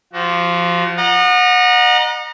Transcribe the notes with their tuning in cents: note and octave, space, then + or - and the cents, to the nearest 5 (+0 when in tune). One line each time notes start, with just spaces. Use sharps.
F3 -5 F#4 +30
D#5 -35 F#5 -25 A#5 +25